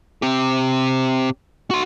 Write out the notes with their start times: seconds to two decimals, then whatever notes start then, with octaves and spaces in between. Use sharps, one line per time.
0.22 C4 G4
1.71 F#4 C6